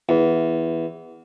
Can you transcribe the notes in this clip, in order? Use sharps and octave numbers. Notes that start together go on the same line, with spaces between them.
E2